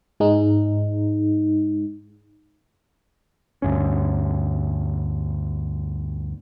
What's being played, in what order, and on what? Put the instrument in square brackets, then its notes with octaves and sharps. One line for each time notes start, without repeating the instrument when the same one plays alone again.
[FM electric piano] G#2 G#3 D#4
[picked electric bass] D2 G2 C#4